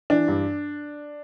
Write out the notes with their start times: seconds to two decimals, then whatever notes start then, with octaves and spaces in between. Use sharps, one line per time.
0.10 E3 D4
0.28 G2